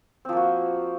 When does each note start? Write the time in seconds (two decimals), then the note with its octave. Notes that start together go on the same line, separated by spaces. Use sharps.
0.25 C4
0.29 F3
0.33 A#3
0.37 F#4